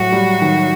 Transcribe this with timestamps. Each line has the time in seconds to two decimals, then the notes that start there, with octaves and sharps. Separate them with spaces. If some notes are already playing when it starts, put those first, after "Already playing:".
Already playing: A2 F#3 G3 F#4
0.12 G3
0.41 D#3